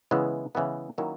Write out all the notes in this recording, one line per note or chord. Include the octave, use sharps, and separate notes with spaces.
C#3 E3 G#3 B3 E4
C#3 E3 G#3 B3 E4
D#3 F#3 A#3 C#4 E4